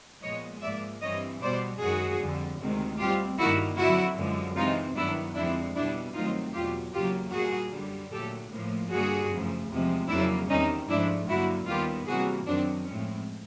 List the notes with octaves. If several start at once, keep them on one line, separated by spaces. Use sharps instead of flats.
A#2 F3 G#3 B3 C#5 D#5
G#2 F3 A#3 D5 E5
G2 E3 G3 C4 C#5 D#5
B2 G3 B3 C5 D5
F#2 D#3 G#3 F#4 G#4
F2 D3 G3
D2 C3 D#3 G#3 C4
B2 G3 C4 F4 G4
G2 D#3 G3 A#3 E4 F#4
F2 D3 F#3 E4 F#4
F#2 D3 F3 G#3
C3 E3 G#3 C4 D#4 F4
G2 D#3 F#3 B3 D4 E4
F2 D3 F3 G#3 C4 D4 E4
B2 G3 B3 D4 E4
G2 D#3 F#3 A3 C4 D#4 F4
E2 B2 F#3 F4 G4
E2 C#3 F#3 A#3 F4 G4
A#2 G3 A#3 F#4 G#4
F#2 D3 G3
A#2 F#3 A3 G4 A4
A2 F3 A#3
G2 D3 G3 A#3 F#4 G#4
F#2 C#3 F3 A3
E2 C3 F3 G#3
F2 C#3 F#3 A#3 D4 E4
E2 C3 D#3 G3 C#4 D#4
G#2 F3 A3 D4 E4
G2 D3 F#3 A#3 E4 F#4
D#2 D#3 G3 B3 F4 G4
C3 E3 G3 A#3 F#4 G#4
F#2 D#3 F#3 C4 D4
A2 F3 G#3 C4 C#4